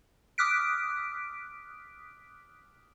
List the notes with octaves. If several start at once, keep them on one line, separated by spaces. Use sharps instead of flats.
D6 D#6 F6 F#6 B6 D7